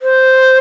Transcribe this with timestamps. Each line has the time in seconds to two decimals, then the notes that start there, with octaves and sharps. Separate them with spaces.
0.02 C5